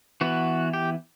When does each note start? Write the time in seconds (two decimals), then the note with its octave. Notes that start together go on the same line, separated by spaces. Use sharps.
0.21 E3 B3 F#4
0.73 G4